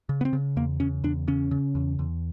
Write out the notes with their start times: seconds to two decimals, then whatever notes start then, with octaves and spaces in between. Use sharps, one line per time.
0.09 C#3
0.21 B3
0.25 C4
0.33 C#3
0.56 E2 A#3
0.80 C#3 C#4
1.04 E2 D4
1.28 C#3 C#4
1.51 C#3
1.75 E2
1.99 E2